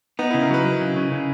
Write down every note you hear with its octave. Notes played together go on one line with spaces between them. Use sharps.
B3 D#4
C#3 E4
A#4
F#3 B4
F#3
C#3
C#3
C#3